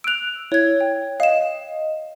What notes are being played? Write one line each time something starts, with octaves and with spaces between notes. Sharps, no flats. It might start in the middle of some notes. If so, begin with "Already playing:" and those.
E6 F#6 D7 F7
E4 C#5 G#6
G5
D#5 F5 E7